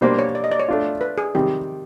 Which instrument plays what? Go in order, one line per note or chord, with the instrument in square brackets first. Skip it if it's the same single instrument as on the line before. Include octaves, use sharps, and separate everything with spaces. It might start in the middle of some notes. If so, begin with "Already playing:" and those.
[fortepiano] B2 G3 A#3 D4 [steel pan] C5
[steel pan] C#5
D5
D#5
D5
C#5
[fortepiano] A3 D4 F4
[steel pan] B4
G#4
[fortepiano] C3 D#3 G3 [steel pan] G4